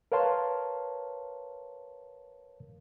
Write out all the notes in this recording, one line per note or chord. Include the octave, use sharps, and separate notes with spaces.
A#4 B4 C#5 F5 A5 C6